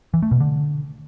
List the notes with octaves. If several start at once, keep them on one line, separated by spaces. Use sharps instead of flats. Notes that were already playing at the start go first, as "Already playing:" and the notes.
E3
A3
B2
D3